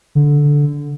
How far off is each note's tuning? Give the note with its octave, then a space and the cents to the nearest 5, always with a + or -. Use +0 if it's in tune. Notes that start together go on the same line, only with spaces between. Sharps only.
D3 -10